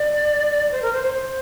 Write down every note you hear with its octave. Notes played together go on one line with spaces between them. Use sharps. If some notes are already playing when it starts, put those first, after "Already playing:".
Already playing: D5
C5
A#4
C5
C5
C5